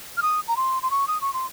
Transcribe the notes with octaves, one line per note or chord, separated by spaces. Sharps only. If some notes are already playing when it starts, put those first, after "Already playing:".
F6
D#6
A#5
C6
C6
C#6
D#6
C#6
C6